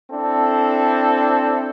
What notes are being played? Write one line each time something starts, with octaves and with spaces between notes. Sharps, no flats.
C4 D4 E4 A4